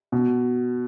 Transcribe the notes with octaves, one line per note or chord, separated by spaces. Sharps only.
B2